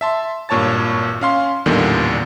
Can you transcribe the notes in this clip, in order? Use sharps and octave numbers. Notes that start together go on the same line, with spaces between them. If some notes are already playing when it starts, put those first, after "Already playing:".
E5 A5 C6
G#1 G2 A#2 C#5 A5 A6
C#4 F5 C6
A1 E2 A#2 D3 D#3 G3